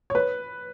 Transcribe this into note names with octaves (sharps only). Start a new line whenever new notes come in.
C#5
B4